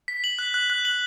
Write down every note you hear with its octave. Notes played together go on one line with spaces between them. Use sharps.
B6
F#7
F#6
F#6
F#6
F#7